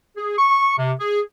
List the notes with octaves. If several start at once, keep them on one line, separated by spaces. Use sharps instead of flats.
G#4
C#6
C3
G#4